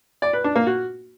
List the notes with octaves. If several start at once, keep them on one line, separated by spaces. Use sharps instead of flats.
D5
B4
D4
A#3
F#4